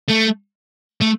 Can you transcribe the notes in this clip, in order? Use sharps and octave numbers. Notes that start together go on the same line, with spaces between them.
A3
A3